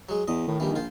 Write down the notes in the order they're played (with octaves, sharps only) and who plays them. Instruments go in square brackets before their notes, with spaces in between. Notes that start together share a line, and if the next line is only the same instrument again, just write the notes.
[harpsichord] F#3 G#3
[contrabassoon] E2 [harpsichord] D#5
[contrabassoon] A2 [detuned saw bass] D#3
[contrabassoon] A#1 [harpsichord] E3 G3
[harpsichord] F4 C5